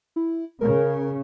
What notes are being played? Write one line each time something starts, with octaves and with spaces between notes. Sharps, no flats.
E4
C#3 A#4